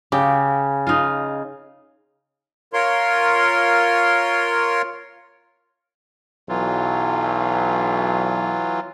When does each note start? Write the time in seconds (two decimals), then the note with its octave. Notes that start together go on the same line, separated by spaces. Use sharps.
0.12 C#3 G4
0.87 D#4 F4
2.73 F4 A#4 C#5 C6
6.49 B1 E3 F#3 F4